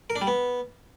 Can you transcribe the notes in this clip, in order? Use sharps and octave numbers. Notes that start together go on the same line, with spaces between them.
A#4
D4
G3
B3